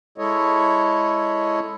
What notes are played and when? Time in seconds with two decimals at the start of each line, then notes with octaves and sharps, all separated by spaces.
0.18 G#3 E4 A4 C#5 D#5